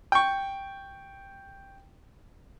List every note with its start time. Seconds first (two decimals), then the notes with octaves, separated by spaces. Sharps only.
0.12 G5 C#6